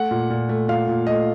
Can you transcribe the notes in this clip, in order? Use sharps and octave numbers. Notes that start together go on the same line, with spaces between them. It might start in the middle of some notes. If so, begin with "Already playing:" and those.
Already playing: A3 F#5
A#2
A#2
A3
A#2 F5
A#2
A3 D#5